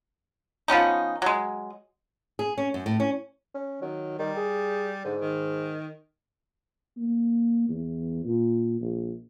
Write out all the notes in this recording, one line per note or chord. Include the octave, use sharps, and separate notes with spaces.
F3 B3 C#4 D#4
F#3 G#3
G#4
C#4
F#2
A2
C#4
C#4
D#3 F#3
D#3 G3
G#4
G#2 D3
D#3
A#3
E2
A#2
A#1